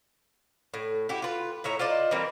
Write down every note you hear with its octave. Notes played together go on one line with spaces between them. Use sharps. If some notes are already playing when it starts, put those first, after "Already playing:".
A2
E4 F#4 G4
F4 B4
A2 C#5 E5 A#5
F4 C5 D5 D#5
E3 G3 A#3 C4